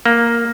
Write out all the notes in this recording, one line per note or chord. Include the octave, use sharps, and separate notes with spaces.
A#3